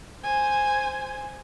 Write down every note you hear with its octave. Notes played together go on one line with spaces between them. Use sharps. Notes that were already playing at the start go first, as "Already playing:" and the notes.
C5 G#5